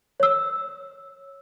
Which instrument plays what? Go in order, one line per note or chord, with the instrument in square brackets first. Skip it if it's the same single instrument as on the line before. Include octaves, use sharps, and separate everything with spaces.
[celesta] C#5 E6